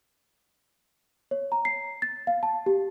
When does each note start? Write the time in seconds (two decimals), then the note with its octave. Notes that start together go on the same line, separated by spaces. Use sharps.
1.31 C#5
1.52 A#5
1.65 C7
2.02 A6
2.27 F5
2.43 A5
2.66 G4